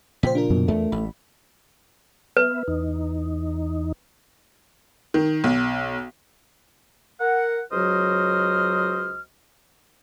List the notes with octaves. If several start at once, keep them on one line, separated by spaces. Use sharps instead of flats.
A#2 C#3 F3 C5 G5 B6
D4 F4 A#4
F#2 B2
E2 A3
A1 B5
B3 B4 E5
E2 D#4
D#3
B1
A#4 F#5
C#2 F#3 F#4 C5 D#5 F6